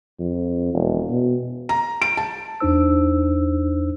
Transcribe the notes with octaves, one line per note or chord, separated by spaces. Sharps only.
F2
E1
B2
A#5
D7
A5
E2 D4 D#4 C5 E6